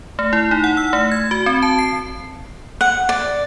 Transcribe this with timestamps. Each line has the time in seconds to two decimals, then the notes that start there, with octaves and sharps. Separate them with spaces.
0.19 A3
0.33 E4
0.51 D#4
0.64 F#5
0.77 E6
0.93 A3
1.12 G#6
1.31 F#4
1.46 C4
1.62 A5
1.79 C7
2.81 F#5
3.09 D5